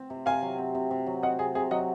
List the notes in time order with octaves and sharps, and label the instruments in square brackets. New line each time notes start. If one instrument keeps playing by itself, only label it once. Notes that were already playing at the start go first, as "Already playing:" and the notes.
Already playing: [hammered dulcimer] C4
C3
[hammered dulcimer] C3 [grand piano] F5 G#5
[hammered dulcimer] F#3
C4
C3
C3
F#3
[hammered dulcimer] C4 [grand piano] D#5 F#5
[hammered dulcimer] C3 [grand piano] G#4
[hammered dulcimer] C3 [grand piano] G#4
[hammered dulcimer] F#3 [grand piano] D#5 F#5